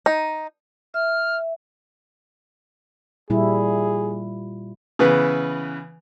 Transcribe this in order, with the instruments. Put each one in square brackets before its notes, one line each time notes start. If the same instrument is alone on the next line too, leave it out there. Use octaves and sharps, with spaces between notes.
[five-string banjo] D#4
[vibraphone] E5 [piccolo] F6
[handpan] A#2 G3 E4 [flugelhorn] G#4
[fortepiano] C#3 E3 B3 B4